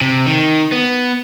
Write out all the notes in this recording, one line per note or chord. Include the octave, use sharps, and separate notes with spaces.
C3
D#3
B3